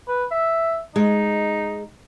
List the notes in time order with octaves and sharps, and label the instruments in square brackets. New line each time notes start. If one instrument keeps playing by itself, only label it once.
[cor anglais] B4
E5
[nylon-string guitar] G#3 [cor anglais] D#4